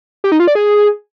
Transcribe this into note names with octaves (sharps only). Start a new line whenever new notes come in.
G4
D#4
F4
D5
G#4